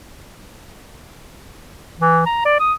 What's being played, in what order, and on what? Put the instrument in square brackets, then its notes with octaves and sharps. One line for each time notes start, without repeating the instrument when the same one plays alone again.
[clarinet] E3
A#5
D5
D#6